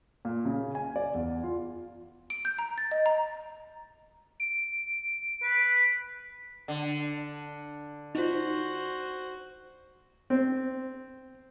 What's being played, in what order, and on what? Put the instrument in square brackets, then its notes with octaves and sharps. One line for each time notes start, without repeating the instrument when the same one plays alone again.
[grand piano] A#2
C#3
G#5
D5
E2
F4
[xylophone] D7
G6
A#5
A6
D#5
A#5
[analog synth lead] D7
[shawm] B4
[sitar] D3
[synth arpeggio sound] D#4 F4 [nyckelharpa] F#4 C5
[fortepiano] C4